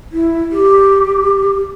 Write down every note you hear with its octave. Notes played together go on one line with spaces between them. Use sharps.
E4
G4